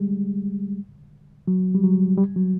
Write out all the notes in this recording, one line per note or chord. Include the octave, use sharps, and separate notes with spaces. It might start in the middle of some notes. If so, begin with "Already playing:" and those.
Already playing: G3 G#3
F#3
G3
F#3
G3
F#3